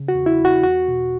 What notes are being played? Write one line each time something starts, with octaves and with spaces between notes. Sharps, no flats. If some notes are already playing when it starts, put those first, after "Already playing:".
Already playing: C#3
F#4
E2
E4
E2
F#4
E2 F#4
B2